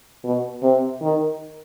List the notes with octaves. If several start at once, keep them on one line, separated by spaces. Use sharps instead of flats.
B2
C3
D#3